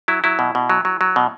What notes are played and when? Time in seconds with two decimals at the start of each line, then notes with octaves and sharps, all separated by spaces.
0.08 F#3 E4
0.24 F#3 E4
0.39 B2
0.55 B2
0.70 F#3
0.85 F#3
1.01 F#3
1.16 B2